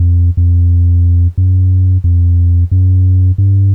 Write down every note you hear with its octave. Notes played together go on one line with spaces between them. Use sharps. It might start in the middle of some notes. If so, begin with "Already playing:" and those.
Already playing: F2
F2
F#2
F2
F#2
G2